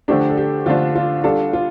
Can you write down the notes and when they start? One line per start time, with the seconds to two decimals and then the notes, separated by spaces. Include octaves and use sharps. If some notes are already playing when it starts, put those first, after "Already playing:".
0.08 D3 F3 A3 D4 G4
0.30 A4
0.37 G4
0.66 D3 F3 A3 D4 F4
0.96 F4
1.24 G3 D4 F4 A4
1.53 F4